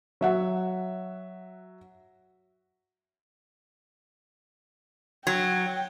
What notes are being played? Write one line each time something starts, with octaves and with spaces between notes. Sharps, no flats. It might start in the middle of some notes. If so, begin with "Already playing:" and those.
F#3 E5 F#5
F#3 G5